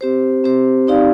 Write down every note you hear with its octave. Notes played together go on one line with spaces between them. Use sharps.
C4 G4 C5
C4 G4 C5
C4 D#4 G4 D5 F5